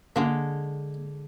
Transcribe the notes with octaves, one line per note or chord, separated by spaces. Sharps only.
D3 G#3 A#3 F#4 A#4